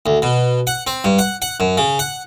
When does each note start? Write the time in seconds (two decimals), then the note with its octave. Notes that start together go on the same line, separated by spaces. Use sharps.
0.06 D2
0.22 B2
0.67 F#5
0.87 C4
1.04 G2
1.19 F#5
1.42 F#5
1.60 F#2
1.78 C#3
1.99 F#5